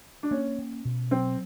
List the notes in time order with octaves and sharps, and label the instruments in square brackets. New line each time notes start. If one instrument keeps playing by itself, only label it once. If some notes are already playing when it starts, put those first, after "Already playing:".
[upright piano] D4
[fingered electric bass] A#3 [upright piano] C#4
[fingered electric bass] C#4
B2
[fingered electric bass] F#3 [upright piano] C4